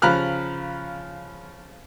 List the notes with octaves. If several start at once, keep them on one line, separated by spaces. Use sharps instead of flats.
C#3 F3 A#5 B5 F6 F#6